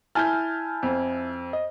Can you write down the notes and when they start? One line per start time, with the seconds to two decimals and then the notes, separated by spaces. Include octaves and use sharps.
0.15 E4 G#5 A5 F6 G6
0.83 F2
1.53 D#5